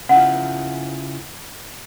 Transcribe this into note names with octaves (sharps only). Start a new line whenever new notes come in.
C#3 E4 F4 F#5